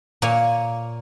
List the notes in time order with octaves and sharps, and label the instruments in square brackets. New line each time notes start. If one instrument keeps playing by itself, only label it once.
[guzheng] A#2 A#3 C#5 G#5